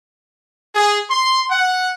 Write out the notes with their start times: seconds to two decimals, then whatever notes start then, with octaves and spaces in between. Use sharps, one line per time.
0.75 G#4
1.10 C6
1.50 F#5